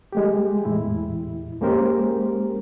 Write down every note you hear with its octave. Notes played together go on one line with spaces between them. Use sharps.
G#3 A3 G4
E2 A2 E4
G#3 A#3 C#4 G4 A#4 C5